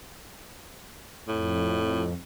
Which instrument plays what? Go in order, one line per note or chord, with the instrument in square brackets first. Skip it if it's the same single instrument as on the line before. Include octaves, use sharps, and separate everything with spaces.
[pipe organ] F2 [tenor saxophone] A2